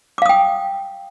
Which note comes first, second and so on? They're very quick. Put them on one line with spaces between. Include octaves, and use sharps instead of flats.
D6 F5 D#6 G5